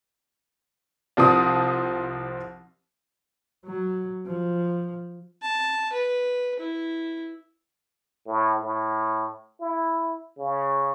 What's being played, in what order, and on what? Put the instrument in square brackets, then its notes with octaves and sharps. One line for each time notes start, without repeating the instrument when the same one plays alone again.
[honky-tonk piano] C2 F3 C4 D#6
[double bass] F#3
F3
[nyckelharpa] A5
B4
E4
[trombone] A2
A2
E4
C#3